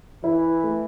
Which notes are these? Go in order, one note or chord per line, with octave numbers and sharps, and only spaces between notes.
E3 E4
A3